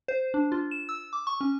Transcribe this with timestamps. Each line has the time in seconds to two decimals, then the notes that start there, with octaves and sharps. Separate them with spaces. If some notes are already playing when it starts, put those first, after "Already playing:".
0.08 C5
0.34 D4
0.52 F4
0.71 E7
0.89 E6
1.13 D6
1.27 C#6
1.41 C#4